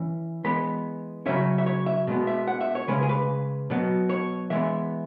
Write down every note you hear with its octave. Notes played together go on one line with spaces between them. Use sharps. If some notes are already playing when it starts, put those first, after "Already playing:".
Already playing: E3 C#4
E3 G#3 B3 B5
C#3 F#3 C#4 E5
E5
C#5
E5
B2 G#3 B3
E5
F#5
E5
C#5
C#3 G#3 C#4 B4
G#4
B4
B2 F#3 B3
C#5
E3 G#3 B3 E5